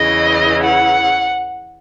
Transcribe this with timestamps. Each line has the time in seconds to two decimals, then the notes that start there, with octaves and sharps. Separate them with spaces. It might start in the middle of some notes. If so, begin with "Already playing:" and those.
Already playing: E2 C#3 E3 D#5
0.62 F#5